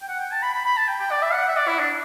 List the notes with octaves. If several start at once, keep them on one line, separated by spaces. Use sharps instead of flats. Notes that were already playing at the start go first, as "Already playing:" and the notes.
G5
F#5
G5
A5
B5
B5
B5
A5
G5
G5
D5
E5
F#5
E5
D5
E4
D4